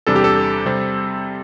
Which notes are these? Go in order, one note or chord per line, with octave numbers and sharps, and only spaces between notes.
E2 C3 G3 D4 A4
G4
A4
C3 G3 C4